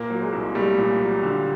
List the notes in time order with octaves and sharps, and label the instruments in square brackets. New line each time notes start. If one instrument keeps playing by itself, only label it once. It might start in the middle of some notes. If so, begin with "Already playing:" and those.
Already playing: [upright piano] A#2 [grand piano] A#3
[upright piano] F#3
[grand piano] G#3
[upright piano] C2
[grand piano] G3 [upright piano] A3
[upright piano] A#2
F#3
D3